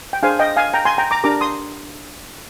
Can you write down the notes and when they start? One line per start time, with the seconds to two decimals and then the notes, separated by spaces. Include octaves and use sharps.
0.13 G5
0.23 D4 G#4 C5 F5 G#5
0.39 D#5 G5
0.57 F5 G#5
0.74 G5 A#5
0.85 G#5 C6
0.98 G5 A#5
1.11 A#5 D6
1.24 D4 G4 A#4 A#5 D6
1.41 C6 D#6